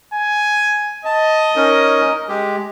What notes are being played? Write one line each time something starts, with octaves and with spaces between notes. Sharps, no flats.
G#5
D#5 A5
C#4 D#4 A#4
G#3 G4